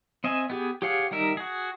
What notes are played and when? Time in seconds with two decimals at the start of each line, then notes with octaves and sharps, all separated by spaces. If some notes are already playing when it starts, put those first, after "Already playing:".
0.24 C4 D#5 E5 G#5
0.50 B3 G4 G#4
0.82 G4 G#4 C#5 F5 F#5
1.11 D#3 G3 D#4 A#4 E5
1.37 F#4 G#4